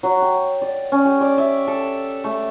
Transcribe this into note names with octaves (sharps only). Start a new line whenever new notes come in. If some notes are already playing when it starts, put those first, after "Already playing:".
F#3
G5
D5
C#4
G4
D5
E5
A4
A3